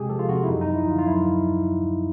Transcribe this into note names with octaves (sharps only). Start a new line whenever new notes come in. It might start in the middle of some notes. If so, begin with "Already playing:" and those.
Already playing: C3 G#3 G4 G#4
F3 A4
F4
C3 F#4
E4
F#2 D#4
D#4
F3
E4
D3 F4
F4
F#2 E4